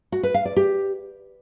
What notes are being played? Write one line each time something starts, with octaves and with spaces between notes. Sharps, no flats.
F#4
B4
F5
D5
G4